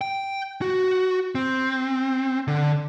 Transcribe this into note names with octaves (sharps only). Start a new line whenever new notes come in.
G5
F#4
C4
D3